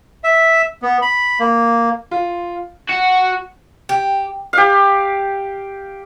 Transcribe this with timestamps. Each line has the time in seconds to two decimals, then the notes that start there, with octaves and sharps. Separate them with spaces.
0.24 E5
0.82 B3
1.02 B5
1.39 A#3
2.11 F4
2.90 F#4
3.89 G4
4.53 G4 F5